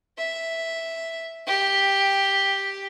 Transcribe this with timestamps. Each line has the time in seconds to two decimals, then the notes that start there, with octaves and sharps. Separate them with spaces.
0.18 E5
1.47 G4